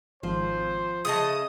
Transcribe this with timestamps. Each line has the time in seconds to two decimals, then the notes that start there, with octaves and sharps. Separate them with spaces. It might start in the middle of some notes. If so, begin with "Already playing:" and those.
0.23 G#1 F3 C5
1.05 C#3 A3 D#5 A5 D#6